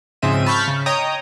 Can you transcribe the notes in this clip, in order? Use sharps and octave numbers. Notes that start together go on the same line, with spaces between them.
G#2 C#3 F3 C4 E5 D#7
A5 B5 C#6 F6 G6 B6
C#3
C#5 D#5 G5 A#5 D#6